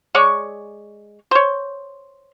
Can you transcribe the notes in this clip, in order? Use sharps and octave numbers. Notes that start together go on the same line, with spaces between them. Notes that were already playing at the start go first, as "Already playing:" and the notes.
G#3 C#5 D5 C#6
C5 C#5